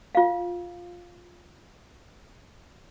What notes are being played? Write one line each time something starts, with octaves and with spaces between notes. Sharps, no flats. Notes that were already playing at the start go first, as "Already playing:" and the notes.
F4 F5